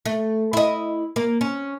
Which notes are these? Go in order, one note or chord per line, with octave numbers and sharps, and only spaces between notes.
A3
E4 D#5
A#3
C#4